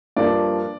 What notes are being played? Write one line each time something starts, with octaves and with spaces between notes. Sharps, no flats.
G2 F3 A#3 D4 D5